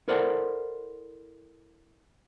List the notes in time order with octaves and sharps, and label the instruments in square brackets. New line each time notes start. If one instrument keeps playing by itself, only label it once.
[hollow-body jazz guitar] E4 A4 A#4 C5 D5 F#5